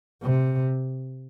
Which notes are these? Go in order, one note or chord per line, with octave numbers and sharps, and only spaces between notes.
C3